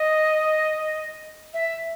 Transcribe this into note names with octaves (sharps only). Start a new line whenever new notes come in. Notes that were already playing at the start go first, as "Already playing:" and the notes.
Already playing: D#5
E5